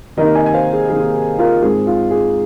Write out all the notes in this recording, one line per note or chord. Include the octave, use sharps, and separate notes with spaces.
C3 D#3 A#3 D#4 A#4 D#5
D#5 G#5
G#5
C5 F5
G#4
C3 D#3 A#3 D#4 G#4
F4 A#4
G#2 G#3 C4 D#4 G#4
F4
G#4